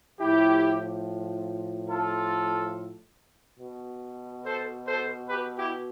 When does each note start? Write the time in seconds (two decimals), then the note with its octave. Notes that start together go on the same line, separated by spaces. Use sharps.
0.19 A2 F3 E4 G4
1.89 F4 A4
3.60 B2
4.44 A4 C5
4.86 A4 C5
5.28 G4 B4
5.57 E4 G4